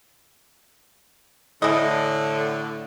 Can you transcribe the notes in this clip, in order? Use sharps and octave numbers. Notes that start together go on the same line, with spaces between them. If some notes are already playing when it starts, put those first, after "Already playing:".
A2 D3 E3 D#5